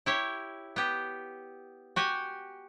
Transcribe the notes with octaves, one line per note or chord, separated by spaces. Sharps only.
E4 G4 C#5
B3 G4
F#4 G4 G#5